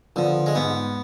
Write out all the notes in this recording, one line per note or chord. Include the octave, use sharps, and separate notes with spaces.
D3 F3 B3 F4
G#3
G#2 B3